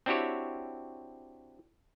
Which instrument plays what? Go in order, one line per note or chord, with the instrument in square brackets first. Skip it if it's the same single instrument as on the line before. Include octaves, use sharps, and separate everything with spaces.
[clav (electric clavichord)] C4 D4 E4 F#4 G4 C#5